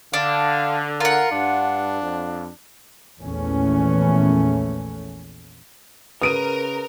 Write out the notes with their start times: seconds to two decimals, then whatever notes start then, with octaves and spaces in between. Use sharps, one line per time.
0.14 D3 D4 F5
1.00 F4 A#4 F#5
1.31 G2 D4
2.02 F2
3.19 A#1 E2 E3 A3 C#4
6.22 C#3 A#4 B4 D#6 D7 D#7